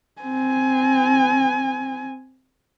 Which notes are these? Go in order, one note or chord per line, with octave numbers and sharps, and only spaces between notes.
C4 G#5